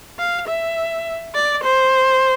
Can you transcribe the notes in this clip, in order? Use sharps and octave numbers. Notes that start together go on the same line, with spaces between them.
F5
E5
D5
C5